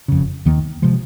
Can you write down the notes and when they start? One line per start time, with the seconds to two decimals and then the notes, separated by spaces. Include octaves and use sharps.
0.08 F#1 F2 C#3
0.45 D#2 D#3 A#3
0.82 C3 F3 G#3